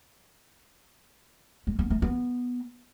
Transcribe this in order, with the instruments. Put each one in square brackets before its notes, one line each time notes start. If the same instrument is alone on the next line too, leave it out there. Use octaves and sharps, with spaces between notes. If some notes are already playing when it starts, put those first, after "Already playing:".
[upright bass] G#3
B3
A3
B3